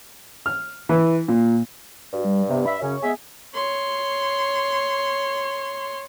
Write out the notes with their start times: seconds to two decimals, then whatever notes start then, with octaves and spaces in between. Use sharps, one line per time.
0.46 F6
0.89 E3
1.28 A#2
2.13 G2 F#4
2.25 G3
2.49 C3 B3
2.66 E5 B5
2.80 F#2 C#3 C#4 C#5
3.02 G#3 B3 G#4 E5
3.54 C#5 C6